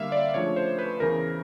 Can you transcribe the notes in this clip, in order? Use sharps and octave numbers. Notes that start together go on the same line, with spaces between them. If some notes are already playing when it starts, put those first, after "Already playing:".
Already playing: D3 G3 A#3 E5 F5
D5
C#3 F3 A3 D4 C#5
C5
B4
E2 C#3 E3 A#4